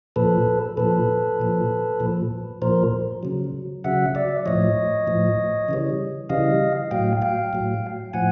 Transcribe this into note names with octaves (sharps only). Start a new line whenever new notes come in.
A#2 F3 A4 B4
A#2 F3 A4 B4
A#2 F3
A#2 F3
A#2 F3 A#4 C5
C#3 F#3
C#3 F#3 E5 F#5
D5 E5
A2 F3 C#5 D#5
A2 F3
C#3 E3 G3
C#3 E3 G3 D#5 F5
A2 F#3 F5 G5
F5 G5
A2 F#3
A2 F3 F#5 G#5